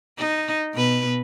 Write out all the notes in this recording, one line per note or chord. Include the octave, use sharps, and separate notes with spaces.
D#4
B2 B4